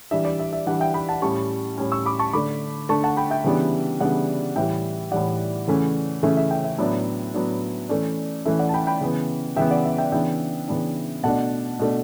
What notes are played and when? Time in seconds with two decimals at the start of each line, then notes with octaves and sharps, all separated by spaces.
0.11 E3 G3 D4 E5
0.25 D5
0.39 E5
0.53 E5
0.66 E3 G3 D4 D5 F#5
0.80 E5 G5
0.94 G5 B5
1.08 F#5 A5
1.22 A2 G3 C#4 A5 C#6
1.78 A2 G3 C#4
1.92 C#6 E6
2.06 B5 D6
2.19 A5 C#6
2.33 D3 A3 D4 B5 D6
2.89 D3 A3 D4 A5 C#6
3.04 F#5 A5
3.17 G5 B5
3.30 E5 G5
3.44 C#3 E3 G3 B3 D4
4.00 C#3 E3 G3 B3 D4 D5 F#5
4.56 A2 E3 G3 E5 G5
5.12 A2 E3 G3 D5 F#5
5.67 C#3 E3 A3 C#4
6.23 C#3 E3 A3 C#4 E5
6.37 E5
6.51 E5 G5
6.64 E5
6.78 A2 F#3 B3 D4 E5
7.34 A2 F#3 B3 D4
7.89 E3 A3 C#4 D5
8.45 E3 A3 C#4 E5
8.59 D5 F#5
8.69 A5
8.74 G5 B5
8.87 G5 B5
9.01 C#3 E3 B3
9.56 C#3 E3 B3 E5 G5
9.71 D5 F#5
9.85 E5
9.98 E5 G5
10.12 C#3 E3 B3 D4 E5 G5
10.68 C#3 E3 B3 D4
11.23 B2 A3 D4 F#5 A5
11.79 B2 A3 D4